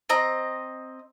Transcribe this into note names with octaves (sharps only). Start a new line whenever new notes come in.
C4 D#5 A#5